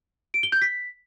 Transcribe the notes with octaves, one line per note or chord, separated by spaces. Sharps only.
D7
G7
G6
B6